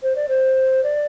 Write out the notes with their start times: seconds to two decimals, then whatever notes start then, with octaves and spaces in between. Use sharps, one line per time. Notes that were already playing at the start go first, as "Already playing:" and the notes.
0.02 C5
0.16 D5
0.29 C5
0.83 D5